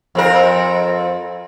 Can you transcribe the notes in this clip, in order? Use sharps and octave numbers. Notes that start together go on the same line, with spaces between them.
F2 C4 A#4